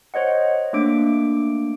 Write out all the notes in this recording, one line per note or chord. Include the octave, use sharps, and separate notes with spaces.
C5 C#5 D#5 F#5
A3 A#3 D4 D6 D7